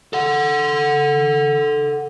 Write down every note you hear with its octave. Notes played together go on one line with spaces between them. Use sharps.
A4 F#5